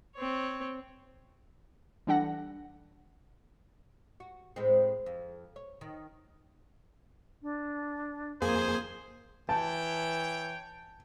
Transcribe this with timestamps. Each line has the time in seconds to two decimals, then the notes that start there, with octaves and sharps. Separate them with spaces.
0.16 C4 C#5
2.07 E3 G3 D4 A4 F#5 A#6
4.20 F#4
4.56 A2 G#3 C4
5.06 F2
5.56 C#5
5.81 D#3
7.42 D4
8.42 F2 A#3 G#4 C5 G#5
9.49 E3 C#5 G5 A5